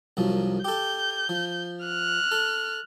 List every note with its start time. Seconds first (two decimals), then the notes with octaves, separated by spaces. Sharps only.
0.17 C2 F#2 F3
0.64 G4 A4 G6
1.29 F3
1.84 F6 F#6
2.31 A4